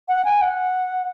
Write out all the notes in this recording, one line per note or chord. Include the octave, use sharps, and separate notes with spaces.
F#5
G#5
F#5